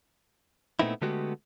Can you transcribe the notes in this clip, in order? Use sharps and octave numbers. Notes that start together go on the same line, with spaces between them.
A#2 A3 B3 C4 D#4 E4
D3 G#3 A3 B3 F#4 G4